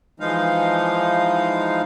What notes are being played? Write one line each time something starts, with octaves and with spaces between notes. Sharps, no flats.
E3 F3 G#3 D#4 F5